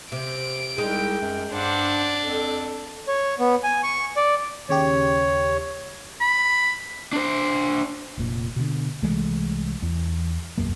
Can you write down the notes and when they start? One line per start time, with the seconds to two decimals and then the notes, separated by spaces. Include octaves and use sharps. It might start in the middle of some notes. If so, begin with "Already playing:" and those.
0.12 C3 D7
0.78 C2 G#3 D#4 G5
1.21 F#2
1.52 G2 D4 C5 F#5
2.24 F2 A4
3.08 C#5
3.39 B3
3.63 G#5
3.83 C#6
4.17 D5
4.69 D#2 C#3 G4 C#5
6.21 B5
7.13 D4 C5
8.17 F1 A#2
8.56 B2 D3
9.02 C2 E3 G#3 A3
9.82 E2
10.58 E1 B1 F#2 A#3